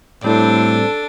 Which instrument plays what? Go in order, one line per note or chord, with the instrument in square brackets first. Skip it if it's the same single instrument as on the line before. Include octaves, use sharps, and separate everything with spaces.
[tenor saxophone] A2 [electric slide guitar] G3 C4 [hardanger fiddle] D4 D6 [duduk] A4